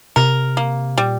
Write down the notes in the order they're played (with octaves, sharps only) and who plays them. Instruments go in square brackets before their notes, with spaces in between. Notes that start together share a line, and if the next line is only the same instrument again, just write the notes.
[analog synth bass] C3 [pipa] A#4
[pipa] A#3
[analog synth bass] A#2 [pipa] G3